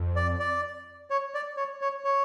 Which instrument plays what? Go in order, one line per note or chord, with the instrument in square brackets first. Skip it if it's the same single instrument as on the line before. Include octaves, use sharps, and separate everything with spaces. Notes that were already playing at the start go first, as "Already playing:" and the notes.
Already playing: [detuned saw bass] F2
[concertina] D5
D5
C#5
D5
C#5
C#5
C#5